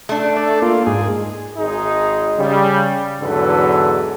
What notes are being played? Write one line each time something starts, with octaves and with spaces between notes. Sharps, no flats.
A3 D4
A4 D5
A#3 F4
G#2 G#4
G#1 G#3 D#4 G#4
C#3 G3
E2 G#2 D3 F#3 A4 B4